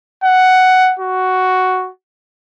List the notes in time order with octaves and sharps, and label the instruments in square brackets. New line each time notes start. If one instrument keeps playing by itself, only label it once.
[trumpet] F#5
F#4